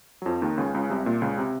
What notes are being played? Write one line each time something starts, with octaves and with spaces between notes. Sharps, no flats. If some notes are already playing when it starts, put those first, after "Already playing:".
F#3
F2 F3
D#2 D#3
C#2 C#3
C#2 C#3
C2 C3
A#2
C#2 C#3
C3